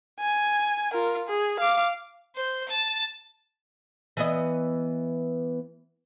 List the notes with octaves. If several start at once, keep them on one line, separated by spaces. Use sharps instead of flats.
G#5
F4 A#4
G#4
F5 D6
C5
A5
E3 B3 D#5